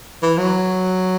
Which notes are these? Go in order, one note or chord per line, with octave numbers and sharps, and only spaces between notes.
E3
F#3